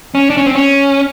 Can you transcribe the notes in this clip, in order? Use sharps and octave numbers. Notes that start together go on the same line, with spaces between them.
C#4
D4
C#4
C4
C#4